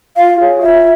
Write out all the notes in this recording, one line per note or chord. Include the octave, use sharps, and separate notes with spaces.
F4 F5
G#4 C#5
F4 E5